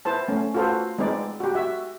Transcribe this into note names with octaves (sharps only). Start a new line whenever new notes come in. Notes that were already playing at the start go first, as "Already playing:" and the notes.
E4 B4 C5 A5
A3 C#4
F4 F#4 A4 B4 C5
G#3 C4 D#4 B4 D5
F#4 G4
F#4 E5